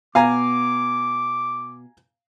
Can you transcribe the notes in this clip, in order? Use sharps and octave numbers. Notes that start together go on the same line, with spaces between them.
B2 F5 G#5 A#5 D6